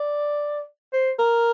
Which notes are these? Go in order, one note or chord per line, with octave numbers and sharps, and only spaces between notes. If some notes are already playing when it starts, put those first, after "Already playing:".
Already playing: D5
C5
A#4